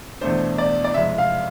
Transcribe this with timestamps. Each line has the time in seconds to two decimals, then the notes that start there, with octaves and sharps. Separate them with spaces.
0.21 E2 B2 A3 D4 C5
0.58 D5
0.84 D5
0.94 F2 C3 G#3 E5
1.18 F5